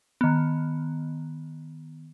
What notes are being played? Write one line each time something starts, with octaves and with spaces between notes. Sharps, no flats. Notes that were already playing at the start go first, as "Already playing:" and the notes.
D#3 B3